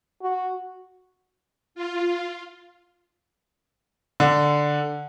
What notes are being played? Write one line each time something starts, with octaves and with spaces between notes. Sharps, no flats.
F#4
F4
D3